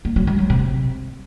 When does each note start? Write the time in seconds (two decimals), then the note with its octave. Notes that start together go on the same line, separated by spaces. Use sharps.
0.05 A#3
0.16 F#3
0.27 G#3
0.39 F#3
0.50 C3